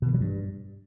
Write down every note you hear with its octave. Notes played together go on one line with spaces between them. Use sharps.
B2
D#3
F#3
G2